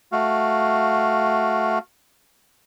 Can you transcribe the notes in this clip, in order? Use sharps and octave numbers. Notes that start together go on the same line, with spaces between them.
A3 F#4 F5